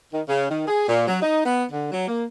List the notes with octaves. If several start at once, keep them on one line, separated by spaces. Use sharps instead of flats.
D#3
C#3
D#3
G#4
A#2
F#3
D#4
B3
D3
F#3
A#3